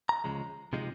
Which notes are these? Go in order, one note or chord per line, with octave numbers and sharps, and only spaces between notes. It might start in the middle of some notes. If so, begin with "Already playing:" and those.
A#5
C#2 C#3 F3 G#3
C3 F3 G#3 D#4